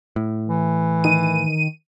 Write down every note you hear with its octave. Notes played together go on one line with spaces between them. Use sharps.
A2
E3
D#3 D#7